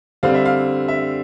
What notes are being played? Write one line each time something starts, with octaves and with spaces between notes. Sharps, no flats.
D3 G3 C4 F5
E5
F5
E5